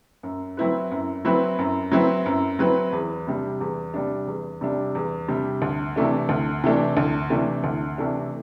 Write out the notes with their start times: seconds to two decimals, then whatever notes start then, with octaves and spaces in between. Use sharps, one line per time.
0.23 F#2
0.57 F#3 C4 E4 B4
0.91 F#2
1.25 F#3 C4 E4 B4
1.59 F#2
1.92 F#3 C4 E4 B4
2.26 F#2
2.59 F#3 C4 E4 B4
2.93 E2
3.27 C3 G3 D4
3.60 E2
3.94 C3 G3 D4
4.27 E2
4.61 C3 G3 D4
4.95 E2
5.28 C3 G3 D4
5.62 D2
5.96 C3 E3 A3 D4
6.29 D2
6.64 C3 E3 A3 D4
6.97 D2
7.30 C3 E3 A3 D4
7.64 D2
7.98 C3 E3 A3 D4